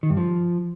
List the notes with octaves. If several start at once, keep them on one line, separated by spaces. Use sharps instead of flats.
D#3
G2
F3